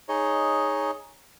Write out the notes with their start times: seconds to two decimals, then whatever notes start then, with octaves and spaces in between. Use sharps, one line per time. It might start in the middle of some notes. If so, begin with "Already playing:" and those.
0.09 D#4 G#4 C#5 D#5